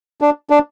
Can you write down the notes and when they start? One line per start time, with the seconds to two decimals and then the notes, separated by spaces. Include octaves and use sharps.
0.21 D4
0.50 D4